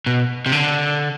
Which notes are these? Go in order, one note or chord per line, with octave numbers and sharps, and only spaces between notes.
B2
C3
D3